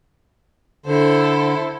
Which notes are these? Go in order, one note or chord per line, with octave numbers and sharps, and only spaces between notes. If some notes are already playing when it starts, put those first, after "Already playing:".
D3 E4 A4 C5